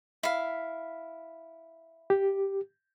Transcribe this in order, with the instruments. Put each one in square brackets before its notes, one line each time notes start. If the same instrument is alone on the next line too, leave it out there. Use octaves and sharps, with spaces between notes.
[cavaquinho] E4 F5
[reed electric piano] G4